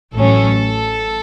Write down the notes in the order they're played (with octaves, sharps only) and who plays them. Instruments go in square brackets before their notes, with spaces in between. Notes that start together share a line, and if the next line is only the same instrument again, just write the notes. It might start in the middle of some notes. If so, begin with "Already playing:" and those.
[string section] A1 A2 F#3 C#4 A4